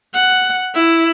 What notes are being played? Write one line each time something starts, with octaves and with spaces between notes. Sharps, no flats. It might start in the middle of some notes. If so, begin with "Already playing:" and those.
F#5
E4